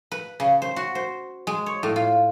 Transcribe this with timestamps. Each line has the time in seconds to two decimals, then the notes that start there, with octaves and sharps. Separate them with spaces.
0.11 B4
0.40 C#3
0.62 C5
0.76 F#4
0.95 C5
1.47 G#3
1.66 C#5
1.83 A2
1.96 F4